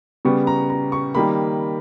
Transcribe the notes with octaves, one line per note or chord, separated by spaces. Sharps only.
C#3 G3 B3 C#6
A#5
A#5
C#6
D#3 G3 A#3 B5